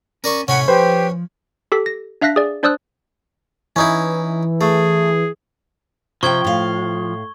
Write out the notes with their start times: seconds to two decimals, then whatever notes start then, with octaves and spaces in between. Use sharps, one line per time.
0.24 C#4 A#4 D5 C#6
0.48 A2 C3 A3 C#4 F#5 G#5 B5
0.68 F3 G4 B4 C5
1.72 G4 A4 B6
1.86 A#6
2.21 D4 E5 F5 F#6 A#6 B6
2.36 G#4 D5
2.63 D4 C5 D5 D#6 E6 F#6
3.76 E3 C#4 D#4 E4
4.61 A3 G#4
6.23 C3 F3 C5 G5 C#6 G#6 G7
6.44 A2 F5